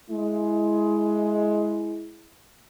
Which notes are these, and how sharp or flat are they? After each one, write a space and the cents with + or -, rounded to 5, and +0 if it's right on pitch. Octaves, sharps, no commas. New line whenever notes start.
G#3 +15 E4 +0